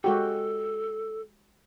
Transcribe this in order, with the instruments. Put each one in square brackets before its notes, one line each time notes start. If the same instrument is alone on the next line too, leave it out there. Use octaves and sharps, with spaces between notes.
[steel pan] G#3 F#4 G4 [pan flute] A4